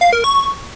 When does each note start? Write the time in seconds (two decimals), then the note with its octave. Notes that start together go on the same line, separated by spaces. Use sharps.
0.01 F5
0.13 A#4
0.24 C#6